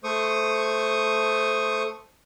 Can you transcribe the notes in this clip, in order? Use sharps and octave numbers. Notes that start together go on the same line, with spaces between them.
A3 C5 C#6 D#6